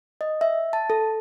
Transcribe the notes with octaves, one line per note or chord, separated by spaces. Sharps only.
D#5
E5
A5
A4